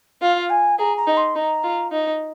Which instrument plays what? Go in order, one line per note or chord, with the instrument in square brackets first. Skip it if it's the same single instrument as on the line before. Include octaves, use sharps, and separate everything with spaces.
[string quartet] F4 [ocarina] F5
[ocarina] G#5
[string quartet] G#4 [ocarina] A#5
[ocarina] A#5
[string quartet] D#4
[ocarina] C6
[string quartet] D#4 [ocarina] A#5
[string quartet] F4
D#4